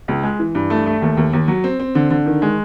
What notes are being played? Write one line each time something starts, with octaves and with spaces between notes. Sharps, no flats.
C#2
G#3
E3
G2
A3
A3
D#2
D#2
D#2
F#3
C4
C4
D3
D3
D#3
G#3